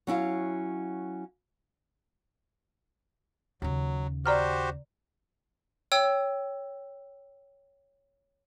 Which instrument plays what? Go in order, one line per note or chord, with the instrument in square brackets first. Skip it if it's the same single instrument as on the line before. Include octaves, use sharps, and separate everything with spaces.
[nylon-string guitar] F#3 C#4 E4 F5
[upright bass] D#2 C#3 [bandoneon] F#3
[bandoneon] F#4 G4 C5 [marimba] D5 A#5 F6
[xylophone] C#5 G5 E6